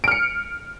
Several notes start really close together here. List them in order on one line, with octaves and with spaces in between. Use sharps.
D7 F6 C#7